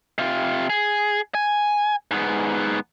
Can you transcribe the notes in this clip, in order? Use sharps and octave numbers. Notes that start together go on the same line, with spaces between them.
C3 F4
G#4
G#5
G#2 B3